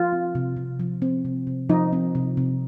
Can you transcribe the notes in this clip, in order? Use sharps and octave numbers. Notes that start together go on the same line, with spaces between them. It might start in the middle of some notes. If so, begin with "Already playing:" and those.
Already playing: F3 F4
C4
C3
C3
F3
C4
C3
C3
F3 D#4
C4
C3
C3